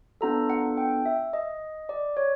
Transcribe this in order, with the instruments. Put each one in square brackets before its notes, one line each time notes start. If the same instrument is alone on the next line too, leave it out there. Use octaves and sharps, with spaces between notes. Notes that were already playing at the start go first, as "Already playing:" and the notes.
[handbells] B3 D4 F4 A4 A#5
F#5
G5
E5
D#5
D5
C#5